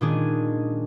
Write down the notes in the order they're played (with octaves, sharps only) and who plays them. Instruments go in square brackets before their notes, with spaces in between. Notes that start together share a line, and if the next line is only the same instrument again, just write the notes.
[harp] A#2 D#3 G#3 C#4 D4 G#4